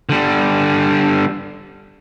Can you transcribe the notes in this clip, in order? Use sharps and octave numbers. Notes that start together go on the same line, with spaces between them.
D3 G3